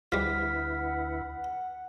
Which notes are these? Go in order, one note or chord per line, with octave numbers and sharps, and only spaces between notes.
D2 F3 G3 E4 B4 F#5 F6 B6